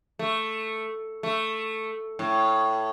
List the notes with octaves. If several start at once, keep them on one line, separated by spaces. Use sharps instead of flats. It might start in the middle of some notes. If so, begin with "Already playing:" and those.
A3
A3
A2